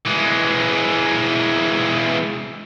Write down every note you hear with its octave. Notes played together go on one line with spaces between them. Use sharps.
E3 G#3